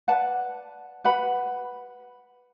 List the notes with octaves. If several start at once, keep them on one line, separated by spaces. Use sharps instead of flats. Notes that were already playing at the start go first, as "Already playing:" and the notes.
B4 D5 F#5 A5
B4 F#5 B5